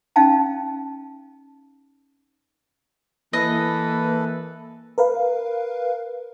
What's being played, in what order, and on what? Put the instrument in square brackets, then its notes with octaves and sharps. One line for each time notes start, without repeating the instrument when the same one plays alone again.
[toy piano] C#4 D#4 F5 G5 A5
[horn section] E3 [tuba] A#3 [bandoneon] A4 B4 [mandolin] D#5
[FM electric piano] A#4 B4 F5